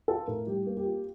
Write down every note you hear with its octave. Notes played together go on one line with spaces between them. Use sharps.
F4 A4
A2 A#4
G3 G4
A#3
G4
F4